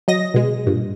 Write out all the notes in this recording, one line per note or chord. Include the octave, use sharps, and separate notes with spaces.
F#3 D#5 A#6
B2 G#3
G2 A#2